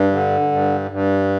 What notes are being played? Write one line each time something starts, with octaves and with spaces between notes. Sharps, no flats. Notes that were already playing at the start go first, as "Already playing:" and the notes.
Already playing: G2
D3
G2
G2